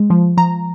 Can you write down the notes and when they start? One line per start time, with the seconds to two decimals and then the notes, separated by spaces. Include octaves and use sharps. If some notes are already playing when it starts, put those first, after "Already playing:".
Already playing: G#3
0.10 F3
0.37 F3 A#5